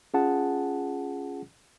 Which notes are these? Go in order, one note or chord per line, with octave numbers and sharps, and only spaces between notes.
C#4 F4 G#4 F#5 A5